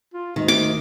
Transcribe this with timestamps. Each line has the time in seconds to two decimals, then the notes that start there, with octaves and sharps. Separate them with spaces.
0.14 F4
0.36 D2 D#3
0.48 D6